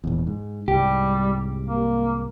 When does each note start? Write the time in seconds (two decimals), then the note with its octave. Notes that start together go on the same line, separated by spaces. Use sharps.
0.04 E1 A#1 E2
0.27 G#2
0.68 C2 G#2 G3 G4
1.66 A#3